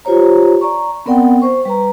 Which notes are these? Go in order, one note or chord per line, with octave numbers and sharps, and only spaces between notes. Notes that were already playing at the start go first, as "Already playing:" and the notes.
F4 G4 C5 C#5 A#5
D5 A#5 C#6
B3 C4 A#4 D5 F#5 G5
C5 C#6
G3 B4 A#5